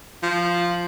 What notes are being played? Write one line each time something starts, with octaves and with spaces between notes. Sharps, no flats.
F3